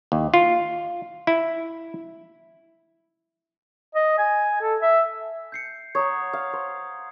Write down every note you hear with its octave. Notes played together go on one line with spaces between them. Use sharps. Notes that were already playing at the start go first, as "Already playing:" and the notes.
D#2
F4
E4
D#5
G#5
A4
E5
G6 C7 C#7
C#5 F#5 A#5 D#6 G#6
F5
C5